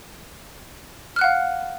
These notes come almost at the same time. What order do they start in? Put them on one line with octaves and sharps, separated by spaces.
F6 F#6 F#5 F5